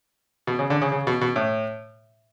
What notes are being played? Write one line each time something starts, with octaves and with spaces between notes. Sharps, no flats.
B2
C#3
D3
C#3
C#3
B2
B2
A2